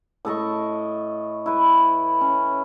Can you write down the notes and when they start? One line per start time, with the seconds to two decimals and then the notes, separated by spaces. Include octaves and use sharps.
0.25 A2 A4 D#5 C#6
1.46 E4 B4
2.21 C#4